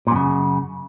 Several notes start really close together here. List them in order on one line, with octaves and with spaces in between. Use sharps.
A#2 F#2 C#3